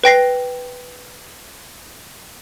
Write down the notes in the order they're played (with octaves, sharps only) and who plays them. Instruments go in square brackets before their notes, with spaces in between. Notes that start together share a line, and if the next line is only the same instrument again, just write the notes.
[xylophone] B4 G5 A#6 C7